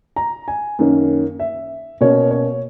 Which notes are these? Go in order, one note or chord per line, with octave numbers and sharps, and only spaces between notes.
A#5
G#5
F#2 D#3 A#3 C#4
E5
B2 A#3 C#4 C#5
C#5